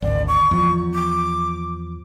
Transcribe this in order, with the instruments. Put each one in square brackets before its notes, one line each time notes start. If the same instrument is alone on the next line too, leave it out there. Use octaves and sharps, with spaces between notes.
[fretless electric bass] G#1 D2 [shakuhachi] D5
[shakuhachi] C#6
[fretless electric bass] E2 F3
[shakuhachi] D6